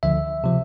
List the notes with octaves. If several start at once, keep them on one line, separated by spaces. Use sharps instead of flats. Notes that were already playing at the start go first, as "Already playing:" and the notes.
D2 D3 F3 E5
C3 F3